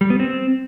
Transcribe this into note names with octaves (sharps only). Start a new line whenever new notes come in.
G3
B3
C4